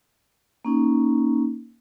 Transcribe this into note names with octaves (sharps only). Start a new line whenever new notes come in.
A#3 C#4 D#4